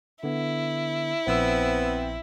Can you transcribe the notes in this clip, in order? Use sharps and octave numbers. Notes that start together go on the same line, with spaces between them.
D3 B3 E4
A#1 B3 C4 E6